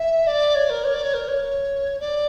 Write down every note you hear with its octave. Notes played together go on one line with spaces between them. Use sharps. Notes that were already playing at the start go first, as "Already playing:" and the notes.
Already playing: E5
D5
C#5
A#4
C#5
D5
C#5
A#4
C#5
D5